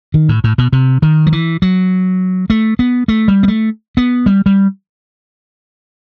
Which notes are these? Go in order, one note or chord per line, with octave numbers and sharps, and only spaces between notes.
D#3
A2
A2
B2
C3
D#3
F#3
E3
F#3
A3
B3
A3
G3
B3
A3
B3
G3
G3